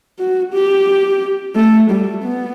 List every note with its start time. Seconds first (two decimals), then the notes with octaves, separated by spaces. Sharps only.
0.19 F#4
0.53 G4
1.56 A3
1.90 G3
2.24 B3